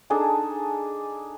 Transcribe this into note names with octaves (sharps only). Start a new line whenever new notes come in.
D4 D#4 G#4 A4